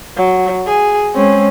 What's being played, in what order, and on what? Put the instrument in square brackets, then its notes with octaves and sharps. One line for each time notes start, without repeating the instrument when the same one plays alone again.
[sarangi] F#3
G#4
[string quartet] G#3 C#4 [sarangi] C4